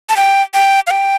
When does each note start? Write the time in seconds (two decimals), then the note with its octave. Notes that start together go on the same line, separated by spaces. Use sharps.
0.09 A5
0.17 G5
0.54 G5
0.87 F5
0.91 G5